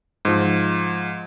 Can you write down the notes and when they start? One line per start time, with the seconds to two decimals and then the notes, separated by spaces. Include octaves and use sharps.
0.25 G#2 F3